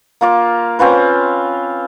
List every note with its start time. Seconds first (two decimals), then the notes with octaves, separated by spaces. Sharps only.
0.21 A#3 F4 D6
0.79 C4 C#4 F4 B4